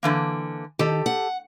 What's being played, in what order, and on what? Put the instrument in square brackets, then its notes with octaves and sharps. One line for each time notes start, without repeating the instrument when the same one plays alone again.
[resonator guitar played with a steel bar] D3 E3 A#3
[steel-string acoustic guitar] D#3 [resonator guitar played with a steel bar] G4 A4
[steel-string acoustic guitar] F#5